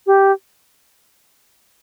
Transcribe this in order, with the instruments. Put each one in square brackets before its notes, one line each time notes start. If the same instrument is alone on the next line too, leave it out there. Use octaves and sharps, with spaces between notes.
[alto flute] G4